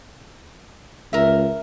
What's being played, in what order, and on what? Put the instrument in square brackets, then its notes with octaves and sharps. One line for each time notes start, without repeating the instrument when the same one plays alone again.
[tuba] C#2 [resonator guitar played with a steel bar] A#4 E5